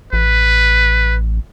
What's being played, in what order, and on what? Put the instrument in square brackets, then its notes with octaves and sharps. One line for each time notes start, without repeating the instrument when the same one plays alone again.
[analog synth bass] A1 [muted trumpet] B4